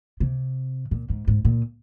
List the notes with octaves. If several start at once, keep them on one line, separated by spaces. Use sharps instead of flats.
C3
A#2
G#2
G#2
A#2